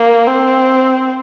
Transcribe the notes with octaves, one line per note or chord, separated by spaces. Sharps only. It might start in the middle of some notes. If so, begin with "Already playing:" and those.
Already playing: A#3
C4